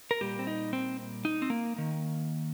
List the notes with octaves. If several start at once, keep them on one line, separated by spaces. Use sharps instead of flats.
A#4
A#2 G3 A#3 G4
C4
D#4
C4
D#4
C4
A#3
D#3 A#3